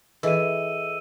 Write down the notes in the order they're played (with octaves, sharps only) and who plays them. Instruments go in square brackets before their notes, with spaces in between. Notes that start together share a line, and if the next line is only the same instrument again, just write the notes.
[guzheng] E3 [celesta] G#4 A4 D#5 [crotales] E6 D#7